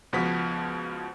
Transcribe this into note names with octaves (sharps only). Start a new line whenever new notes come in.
C#2 B2 F3 B3 B6